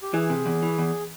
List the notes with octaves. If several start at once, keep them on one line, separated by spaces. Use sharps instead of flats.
G4
E3 G#4
C3
E2
E3
E2